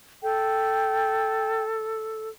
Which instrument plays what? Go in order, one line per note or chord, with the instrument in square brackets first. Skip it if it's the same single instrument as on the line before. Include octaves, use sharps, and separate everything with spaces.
[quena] A4 [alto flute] G5